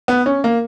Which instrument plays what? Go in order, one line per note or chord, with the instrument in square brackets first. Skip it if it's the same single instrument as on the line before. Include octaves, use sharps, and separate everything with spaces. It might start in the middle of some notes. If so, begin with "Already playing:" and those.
[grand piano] B3
C#4
A#3